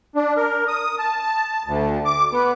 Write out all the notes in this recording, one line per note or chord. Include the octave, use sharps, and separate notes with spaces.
D4
A#4
D#6
A5
D2
D6
B3